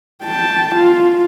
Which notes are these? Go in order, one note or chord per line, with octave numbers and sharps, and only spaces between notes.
G5 A5
F4